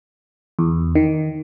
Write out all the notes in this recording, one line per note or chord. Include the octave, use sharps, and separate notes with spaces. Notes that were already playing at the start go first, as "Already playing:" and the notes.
E2
D#3